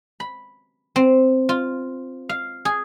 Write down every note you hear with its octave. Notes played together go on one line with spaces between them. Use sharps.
B5
C4
F4
F5
G#4